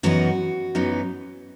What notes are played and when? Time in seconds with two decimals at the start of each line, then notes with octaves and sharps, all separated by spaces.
0.03 F#2 E3 B3 D#4 F#4
0.75 F#2 E3 B3 D#4